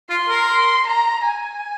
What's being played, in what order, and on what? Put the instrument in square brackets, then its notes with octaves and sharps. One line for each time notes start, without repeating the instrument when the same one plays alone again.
[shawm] F4 [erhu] C6
[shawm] A#4
[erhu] C6
A#5
G#5